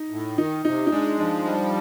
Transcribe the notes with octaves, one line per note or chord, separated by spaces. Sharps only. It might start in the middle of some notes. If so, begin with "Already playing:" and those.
Already playing: D#4
A2
D#3 D#4
C3 D#4
D#4
G#3 D4
F3 D4
G3